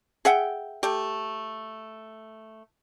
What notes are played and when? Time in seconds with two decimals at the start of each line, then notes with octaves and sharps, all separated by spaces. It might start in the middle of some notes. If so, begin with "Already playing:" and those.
0.25 G#4 E5 F#5 G5
0.83 A3 G4